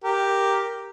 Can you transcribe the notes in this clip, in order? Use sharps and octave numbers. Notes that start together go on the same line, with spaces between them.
G4 A#4